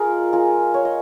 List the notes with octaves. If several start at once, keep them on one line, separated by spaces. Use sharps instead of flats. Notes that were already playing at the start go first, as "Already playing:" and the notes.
Already playing: F4 G#4 A#4 D#5
G#3 F4 G#4
C#5
D#5